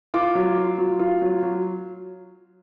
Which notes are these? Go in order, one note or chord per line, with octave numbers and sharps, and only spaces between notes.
F4 D6
F#3
F4
F#3
F4
F#3
F#3